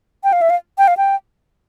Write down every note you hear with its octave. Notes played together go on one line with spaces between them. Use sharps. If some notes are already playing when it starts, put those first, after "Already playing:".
G5
F5
E5
F5
G5
F5
G5